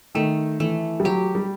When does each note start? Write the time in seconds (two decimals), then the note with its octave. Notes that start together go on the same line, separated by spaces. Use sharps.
0.15 D#3 A3
0.60 E3 A3
1.00 G3
1.04 F#3 G4
1.35 G3